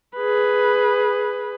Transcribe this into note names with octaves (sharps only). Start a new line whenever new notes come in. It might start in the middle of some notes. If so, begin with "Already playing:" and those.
G#4 B4